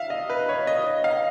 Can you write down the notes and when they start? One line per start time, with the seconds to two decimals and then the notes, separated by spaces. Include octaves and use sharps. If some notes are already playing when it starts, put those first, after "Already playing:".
Already playing: E5 F5
0.10 D#5
0.30 B4
0.49 C#5
0.67 D#5
1.04 F5